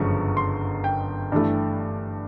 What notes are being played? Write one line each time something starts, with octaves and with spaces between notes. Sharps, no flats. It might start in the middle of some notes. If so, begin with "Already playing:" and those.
Already playing: G1 F#2 C#3 F3 G#3 C#6
C6
G5
G2 E3 A3